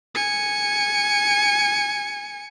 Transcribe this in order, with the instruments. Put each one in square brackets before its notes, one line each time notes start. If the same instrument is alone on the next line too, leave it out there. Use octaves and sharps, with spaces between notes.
[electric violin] G#5 C#7